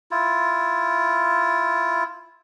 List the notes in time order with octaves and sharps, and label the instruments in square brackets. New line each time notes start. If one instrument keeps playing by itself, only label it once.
[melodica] E4 F4